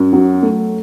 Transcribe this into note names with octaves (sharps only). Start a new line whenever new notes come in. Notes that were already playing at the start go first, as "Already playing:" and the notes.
Already playing: F#2
F#3
A3